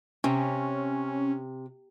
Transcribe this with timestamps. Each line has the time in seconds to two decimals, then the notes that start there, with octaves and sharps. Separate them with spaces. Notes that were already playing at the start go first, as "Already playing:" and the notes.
0.24 C3 C#4